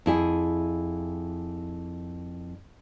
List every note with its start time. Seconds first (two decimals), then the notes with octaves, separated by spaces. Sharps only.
0.06 F2 E4 G#4